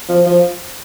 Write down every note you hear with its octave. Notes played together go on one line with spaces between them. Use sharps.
F3
F3